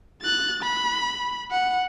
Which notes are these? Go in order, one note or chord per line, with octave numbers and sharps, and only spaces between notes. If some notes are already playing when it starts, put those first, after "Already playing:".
F#6 A6
B5
F#5